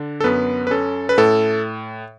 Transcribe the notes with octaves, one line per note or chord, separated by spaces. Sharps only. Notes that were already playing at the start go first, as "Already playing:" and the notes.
Already playing: D3 D4
A4
F#2 B3 B4
B4
C#4 A4
B4
A2 A4